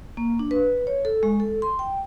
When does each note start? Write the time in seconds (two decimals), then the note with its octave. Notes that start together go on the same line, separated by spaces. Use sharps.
0.17 A#3
0.39 D4
0.51 B4
0.87 C#5
1.05 A4
1.23 G#3
1.40 A4
1.62 C6
1.79 G5